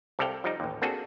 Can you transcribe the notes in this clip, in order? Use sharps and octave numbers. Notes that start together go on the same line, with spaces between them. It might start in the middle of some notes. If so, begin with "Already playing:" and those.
C2 C3 A4 D5 F5 G5
F3 G3 D#4
A1 D#2
A#3 C4 D4 F#4 G#4 A4